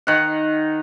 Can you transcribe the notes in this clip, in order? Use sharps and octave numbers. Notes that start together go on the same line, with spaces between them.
D#3 F#5